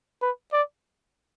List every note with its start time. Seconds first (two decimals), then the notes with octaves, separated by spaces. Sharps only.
0.22 B4
0.52 D5